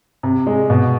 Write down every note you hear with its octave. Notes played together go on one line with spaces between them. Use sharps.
C3
G#3
B2